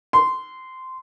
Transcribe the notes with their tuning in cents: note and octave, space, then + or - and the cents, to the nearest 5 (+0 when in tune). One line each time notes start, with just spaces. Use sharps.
C6 -15